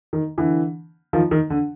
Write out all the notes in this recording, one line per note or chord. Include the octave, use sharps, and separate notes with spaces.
D#3
D3 E3
D#3 F3
D#3
D3